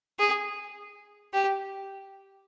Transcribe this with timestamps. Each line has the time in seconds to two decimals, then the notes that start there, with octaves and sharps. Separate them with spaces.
0.19 G#4
1.33 G4